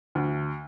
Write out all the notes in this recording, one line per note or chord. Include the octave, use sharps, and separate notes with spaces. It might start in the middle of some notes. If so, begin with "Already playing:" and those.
D2